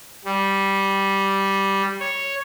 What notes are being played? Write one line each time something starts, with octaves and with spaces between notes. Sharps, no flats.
G3
C#5